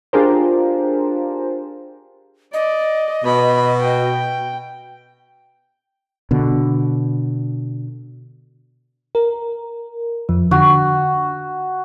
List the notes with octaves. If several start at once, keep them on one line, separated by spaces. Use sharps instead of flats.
D4 F4 G4 G#4 A#4 C5
D5 D#5
B2 B5
G5
B2 D3
A#4
F2 F3
D3 F#4